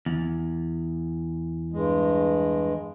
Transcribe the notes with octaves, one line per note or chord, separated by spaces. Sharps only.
E2
G2 G#3